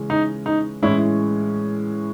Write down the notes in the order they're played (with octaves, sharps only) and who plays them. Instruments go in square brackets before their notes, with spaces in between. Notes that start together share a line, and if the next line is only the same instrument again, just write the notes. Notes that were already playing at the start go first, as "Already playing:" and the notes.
Already playing: [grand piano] C#3 E3 G#3 C#4
[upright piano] D#4
D#4
[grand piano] A2 E3 G#3 C#4 [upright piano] E4